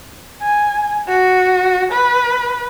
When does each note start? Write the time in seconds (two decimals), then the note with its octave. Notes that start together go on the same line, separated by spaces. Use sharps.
0.42 G#5
1.07 F#4
1.91 B4